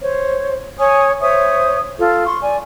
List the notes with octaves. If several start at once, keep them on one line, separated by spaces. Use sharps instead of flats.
C5 C#5
C#5 G#5 D#6
C5 C#5 E5 D#6
F4 A4
C6 C#6
D5 G#5